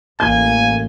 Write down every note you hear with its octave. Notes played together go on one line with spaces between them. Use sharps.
A1 A#3 G#5 G6